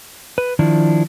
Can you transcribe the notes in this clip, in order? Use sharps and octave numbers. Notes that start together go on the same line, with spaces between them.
B4
D#3 F3 D4 E4